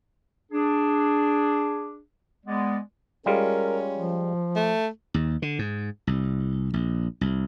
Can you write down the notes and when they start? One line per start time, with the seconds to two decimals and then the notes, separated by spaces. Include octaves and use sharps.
0.51 D4 G#4
2.46 G#3 B3 D5
3.26 G3 G#3 C#4 F4 A#4
3.96 F3
4.56 A3
5.14 D#2
5.42 D3
5.59 G#2
6.07 C2
6.74 A#1
7.21 C2